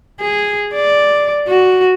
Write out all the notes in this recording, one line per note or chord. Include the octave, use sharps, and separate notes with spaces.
G#4
D5
F#4